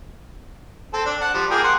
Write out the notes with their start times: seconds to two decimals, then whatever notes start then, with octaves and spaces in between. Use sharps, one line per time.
0.93 C4 A4
1.06 D4
1.21 F#5 A5
1.34 F3 G3
1.50 A#3 G#4 G5
1.64 F#5 C6